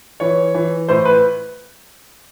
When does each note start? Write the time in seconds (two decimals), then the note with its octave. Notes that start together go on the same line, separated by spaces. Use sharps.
0.20 E3 C#5
0.55 E3
0.89 A2 C5
1.05 B4